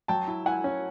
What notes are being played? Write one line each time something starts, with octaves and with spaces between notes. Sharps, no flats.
F#3 G5 A5
E4
E4 F#5 G#5
C#4